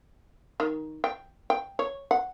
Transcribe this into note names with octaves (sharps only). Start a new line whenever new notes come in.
D#3
G5
G5
C#5
F#5